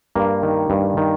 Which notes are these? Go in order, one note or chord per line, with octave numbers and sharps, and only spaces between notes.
G2 A#3
D#3
G2
D#3